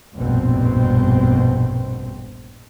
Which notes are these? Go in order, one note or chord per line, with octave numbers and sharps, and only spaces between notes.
F1 A#1 G2 B2 C4